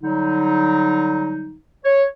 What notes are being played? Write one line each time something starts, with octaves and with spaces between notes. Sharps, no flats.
D3 F#3 G3 D#4
C#5